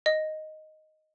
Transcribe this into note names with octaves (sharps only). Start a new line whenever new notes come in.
D#5